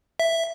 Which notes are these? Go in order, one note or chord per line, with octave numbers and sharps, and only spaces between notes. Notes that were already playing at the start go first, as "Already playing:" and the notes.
E5